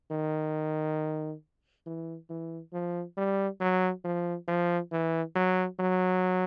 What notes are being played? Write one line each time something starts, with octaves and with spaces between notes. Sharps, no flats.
D#3
E3
E3
F3
G3
F#3
F3
F3
E3
F#3
F#3